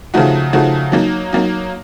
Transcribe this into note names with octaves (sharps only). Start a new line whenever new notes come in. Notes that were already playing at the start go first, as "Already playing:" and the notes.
C#3 F3 A3 D#4 F#4
C#3 F3 A3 D#4 F#4
F#3 A#3 D#4
F#3 A#3 D#4